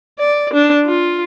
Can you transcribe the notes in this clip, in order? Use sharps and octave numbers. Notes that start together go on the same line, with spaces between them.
D5
D4
F4